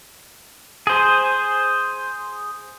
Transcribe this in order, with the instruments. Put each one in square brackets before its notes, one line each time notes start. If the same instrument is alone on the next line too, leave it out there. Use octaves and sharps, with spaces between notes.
[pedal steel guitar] G#4 C5